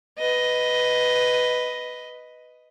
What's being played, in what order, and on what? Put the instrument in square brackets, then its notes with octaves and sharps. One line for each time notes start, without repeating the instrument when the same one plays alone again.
[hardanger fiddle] B4 D#5